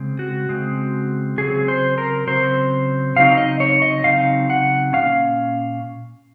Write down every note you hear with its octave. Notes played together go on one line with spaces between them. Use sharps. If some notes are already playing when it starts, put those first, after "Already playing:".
Already playing: C#3 G#3 C4
F#4
C#3 G#3 C4
C#3 F#3 C4 G#4
C5
A#4
C#3 F#3 C4 C5
C#3 F#3 C4 D#4 F5
D#5
C#5
D#5
C#3 F#3 C4 D#4 F5
F#5
A#2 G#3 C#4 F5